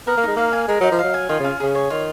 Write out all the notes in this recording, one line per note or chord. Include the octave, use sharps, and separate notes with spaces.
B3 A#4
A#3
G#3 D#4
A#3 F5
G#5
G#3 A#4
F#3 D#4
F3
F#3 F5
G#5
D#3 F4
C#3 C#4
C#3 G#4
C#5
D#3 F4